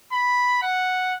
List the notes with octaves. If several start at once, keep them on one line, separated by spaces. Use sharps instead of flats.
B5
F#5